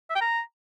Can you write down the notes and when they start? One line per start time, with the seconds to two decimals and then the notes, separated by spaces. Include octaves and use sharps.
0.10 E5
0.16 G5
0.21 A#5